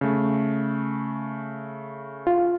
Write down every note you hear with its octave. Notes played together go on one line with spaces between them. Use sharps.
C#3 A3
F4